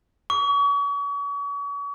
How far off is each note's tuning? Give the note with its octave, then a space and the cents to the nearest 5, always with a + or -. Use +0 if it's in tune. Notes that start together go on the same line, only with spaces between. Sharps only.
C#6 +40